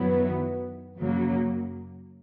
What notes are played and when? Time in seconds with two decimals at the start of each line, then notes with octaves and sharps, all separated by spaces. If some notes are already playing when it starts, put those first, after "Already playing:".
Already playing: F#2 D#3 F#3 B3 E4
0.97 F#2 C#3 F#3 A#3